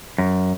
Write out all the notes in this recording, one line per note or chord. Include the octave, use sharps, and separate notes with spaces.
F#2